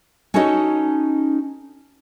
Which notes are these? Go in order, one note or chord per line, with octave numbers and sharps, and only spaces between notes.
C#4 D#4 F#4 A4 C#5 D#5